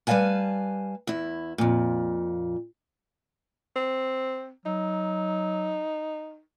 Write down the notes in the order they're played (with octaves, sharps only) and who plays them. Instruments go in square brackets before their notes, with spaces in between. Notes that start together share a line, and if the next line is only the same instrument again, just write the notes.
[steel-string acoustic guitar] G3 B4 D#5 F5 G#5 A5
E2 E4
F2 A#2
[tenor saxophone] C4
[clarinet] F#3 [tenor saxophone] D#4